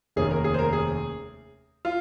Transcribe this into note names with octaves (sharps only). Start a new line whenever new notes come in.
F1 D#2 D#3 A#3 C#4 G#4
A#4
G#4
C5
A#4
G#4
F4